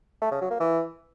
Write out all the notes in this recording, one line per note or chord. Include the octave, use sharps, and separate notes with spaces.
A3
C#3
F#3
A#3
E3